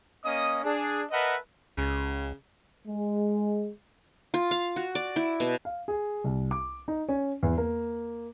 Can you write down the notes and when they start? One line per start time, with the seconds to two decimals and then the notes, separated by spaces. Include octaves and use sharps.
0.25 A#3 C#4 D#5 D#6
0.64 D4 G#4
1.11 A#4 B4 D#5 E5 F#5 A5
1.78 C#2 C#3
2.86 G#3
4.34 F4
4.51 F5
4.76 F#4
4.95 D5
5.16 E4
5.40 B2
5.65 F5
5.88 G#4
6.24 C2
6.51 D6
6.88 D#4
7.09 C#4
7.43 E2
7.58 A#3